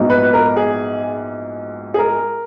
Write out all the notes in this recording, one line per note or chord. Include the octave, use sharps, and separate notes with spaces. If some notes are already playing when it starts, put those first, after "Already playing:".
Already playing: A#1 G#2 F#3 B3 D#4
B4
B4
A#4
G#4
G#4
A#4